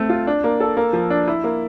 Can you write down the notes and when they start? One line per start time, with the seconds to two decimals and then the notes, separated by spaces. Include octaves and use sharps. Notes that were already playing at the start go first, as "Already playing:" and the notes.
Already playing: A3 C4
0.09 F4
0.27 D4
0.44 A#3
0.60 A4
0.77 A#3
0.93 F3
1.10 D4
1.28 E4
1.44 A#3